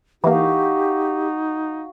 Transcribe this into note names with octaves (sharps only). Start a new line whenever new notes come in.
E3 A#3 D#4 F#4 G4 F5